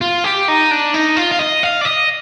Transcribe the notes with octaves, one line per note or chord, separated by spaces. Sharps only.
F4
G4
D#4
D4
D#4
F4
F5
D#5
F5
D5
D#5